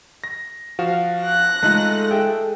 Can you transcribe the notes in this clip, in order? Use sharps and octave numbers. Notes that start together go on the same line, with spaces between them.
A#6
F3 F#4 F5 E7
F#6 A#6
G#3 A3 D#4 F4 A4
G#4 E5 G5